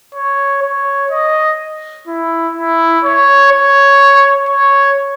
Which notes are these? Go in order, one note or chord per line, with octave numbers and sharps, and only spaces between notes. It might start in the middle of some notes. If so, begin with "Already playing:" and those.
C#5
C#5
D#5
E4
E4
C#5
C#5
C#5